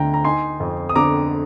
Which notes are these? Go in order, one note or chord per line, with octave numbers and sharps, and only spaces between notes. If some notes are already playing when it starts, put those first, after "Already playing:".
Already playing: D2 D3 G5 A#5
A#5
D#4 G#5 C6
F2
D#6
D3 A#5 D6